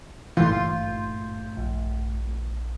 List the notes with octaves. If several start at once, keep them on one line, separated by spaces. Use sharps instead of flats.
G#1 G2 A#2 E3 A3 F4 C6 G6
A#1